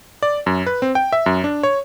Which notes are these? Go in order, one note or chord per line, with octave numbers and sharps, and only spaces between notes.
D5
F#2
B4
C4
G5
E5
F#2
D4
C#5